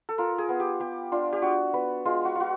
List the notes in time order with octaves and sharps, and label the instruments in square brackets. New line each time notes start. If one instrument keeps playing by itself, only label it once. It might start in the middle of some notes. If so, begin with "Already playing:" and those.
[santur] A4
F4 A#4
G#4
B3
G4
B3 G4
D4 F4
G4
D4 F#4
B3 B4
G#3 F4
F#4
F4
F#4